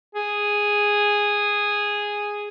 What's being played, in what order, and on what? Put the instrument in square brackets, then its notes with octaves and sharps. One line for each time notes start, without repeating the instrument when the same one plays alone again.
[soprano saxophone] G#4